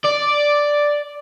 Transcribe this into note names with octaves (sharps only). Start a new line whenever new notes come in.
D5